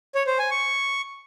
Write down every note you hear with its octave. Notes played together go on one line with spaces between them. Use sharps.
C#5
C5
G#5
C#6